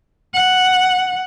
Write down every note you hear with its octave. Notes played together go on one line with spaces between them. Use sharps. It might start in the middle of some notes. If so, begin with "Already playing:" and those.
F#5